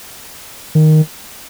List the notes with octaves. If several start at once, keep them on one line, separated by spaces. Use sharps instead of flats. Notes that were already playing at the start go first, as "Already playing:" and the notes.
D#3